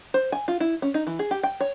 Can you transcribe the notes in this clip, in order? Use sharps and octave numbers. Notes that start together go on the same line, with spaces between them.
C5
G#5
F4
E4
C#4
D#4
E3
G#4
G4
G5
C#5